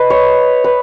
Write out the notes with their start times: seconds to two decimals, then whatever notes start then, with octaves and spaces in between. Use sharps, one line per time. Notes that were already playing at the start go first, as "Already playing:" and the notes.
Already playing: B4 D#5
0.10 C#5
0.64 B4